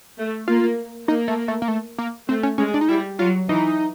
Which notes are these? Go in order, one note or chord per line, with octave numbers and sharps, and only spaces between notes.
A3
A#3 F4
A#3 D#4
A3
A3
A#3
A3
A#3
A3 C4
C#4
G#3 C#4
D4
D#4
G3 E4
F#3 F4
E3 D#4